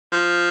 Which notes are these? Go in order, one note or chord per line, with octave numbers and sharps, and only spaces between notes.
F3